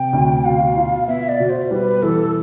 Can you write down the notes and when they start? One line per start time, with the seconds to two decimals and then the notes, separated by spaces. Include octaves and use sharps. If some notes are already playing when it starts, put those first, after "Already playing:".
Already playing: C3 G5
0.13 D2
0.45 B2 F5
0.76 F4
1.07 B3 E5
1.29 D5
1.40 B2
1.49 C5
1.71 G3 B4
2.02 E3 A4